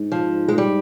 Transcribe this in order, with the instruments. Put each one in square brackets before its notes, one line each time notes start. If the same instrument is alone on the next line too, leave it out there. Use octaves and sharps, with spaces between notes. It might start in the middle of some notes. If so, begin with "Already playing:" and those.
Already playing: [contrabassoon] G#2
[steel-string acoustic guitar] F3
G#3
G3